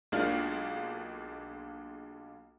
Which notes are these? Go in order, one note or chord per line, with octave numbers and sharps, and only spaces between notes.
B1 G#3 A#3 D4 F4 F6